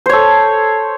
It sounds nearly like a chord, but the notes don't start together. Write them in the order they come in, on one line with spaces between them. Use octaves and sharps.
C5 C#5 A4